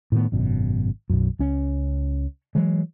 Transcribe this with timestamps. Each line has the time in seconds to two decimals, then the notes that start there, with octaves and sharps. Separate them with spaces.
0.12 A2 D#3 B3
0.32 G#1 F#2 B2
1.10 B1 F#2
1.39 C#2 C#4
2.55 E3 F#3 G#3